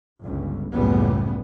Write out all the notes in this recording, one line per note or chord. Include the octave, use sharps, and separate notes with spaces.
G1 C#2
F#1 C#2 A2 G3 B3